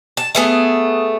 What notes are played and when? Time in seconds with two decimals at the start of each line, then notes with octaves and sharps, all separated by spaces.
0.17 A5
0.35 A3 B3 G#4